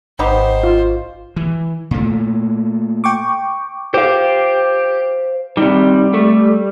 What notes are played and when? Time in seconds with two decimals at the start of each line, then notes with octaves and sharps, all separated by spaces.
0.19 G#1 B3 D#4 G4 C5
0.63 F4
1.36 E3
1.91 A#2 A3
3.04 G5 C#6 D6
3.94 G4 C5 F5
5.57 C3 D#3 G3
6.14 A3